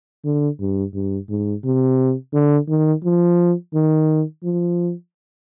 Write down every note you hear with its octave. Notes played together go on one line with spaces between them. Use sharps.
D3
G2
G2
G#2
C3
D3
D#3
F3
D#3
F3